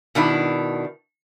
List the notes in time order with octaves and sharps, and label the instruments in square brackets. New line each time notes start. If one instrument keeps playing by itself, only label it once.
[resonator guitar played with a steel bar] B2 D#3 D4 E4